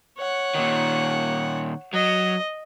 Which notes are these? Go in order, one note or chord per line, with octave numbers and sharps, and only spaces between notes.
C#5 F#5
A#2 D#3
F#3 D#5